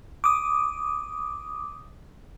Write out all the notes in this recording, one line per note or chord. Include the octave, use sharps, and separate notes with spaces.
D6 D#6